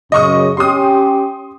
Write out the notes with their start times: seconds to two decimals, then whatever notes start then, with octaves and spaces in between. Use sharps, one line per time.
0.12 F#2 C#3 D#5 C#6 D#6
0.57 C#4 G4 C6 D#6